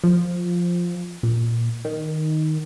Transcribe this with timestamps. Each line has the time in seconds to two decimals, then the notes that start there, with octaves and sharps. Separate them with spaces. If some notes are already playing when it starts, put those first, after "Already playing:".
0.04 F3
1.23 A#2
1.85 D#3